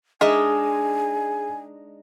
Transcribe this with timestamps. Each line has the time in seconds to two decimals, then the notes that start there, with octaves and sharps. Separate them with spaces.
0.21 G#3 D4 D#4 G#4 A#4 D#5 E5 G#5